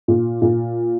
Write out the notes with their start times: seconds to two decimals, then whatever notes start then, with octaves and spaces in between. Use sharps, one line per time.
0.08 A#2
0.42 A#2